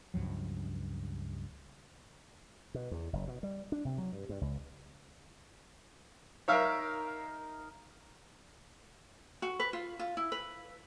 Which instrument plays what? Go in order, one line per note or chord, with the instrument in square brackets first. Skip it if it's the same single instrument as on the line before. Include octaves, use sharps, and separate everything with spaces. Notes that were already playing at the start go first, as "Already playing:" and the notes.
[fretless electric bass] C#2 G2 F3 F#3
[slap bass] B2
E2
F#1
B2
G3
D4
C3
F#3
G2
G2
C#2
[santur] D#4 A#4 [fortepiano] C#5 E5 F5
[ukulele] F#4
B4
F4
F4
E4
B4